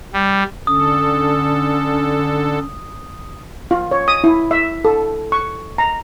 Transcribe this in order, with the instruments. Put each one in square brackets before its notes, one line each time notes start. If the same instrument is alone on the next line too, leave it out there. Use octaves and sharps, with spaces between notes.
[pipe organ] G3
[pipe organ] D3 A4 [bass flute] C#4 [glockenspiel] D#6
[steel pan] F4
C#5
D#6
E4
E5
A4
C#6
A#5